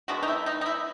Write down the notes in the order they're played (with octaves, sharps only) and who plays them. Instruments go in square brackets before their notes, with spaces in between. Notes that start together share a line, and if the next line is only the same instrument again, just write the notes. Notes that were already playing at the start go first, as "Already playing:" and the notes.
[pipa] D#3 G#3 B3 D4 F#4
D#4
E4
D#4
D#4
E4